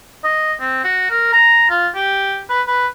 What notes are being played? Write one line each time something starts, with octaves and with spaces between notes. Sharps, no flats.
D#5
C4
F#4
A#4
A#5
F4
G4
B4
B4